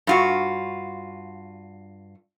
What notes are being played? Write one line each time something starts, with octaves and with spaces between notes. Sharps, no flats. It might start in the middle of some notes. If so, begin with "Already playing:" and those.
G2 F4 F#4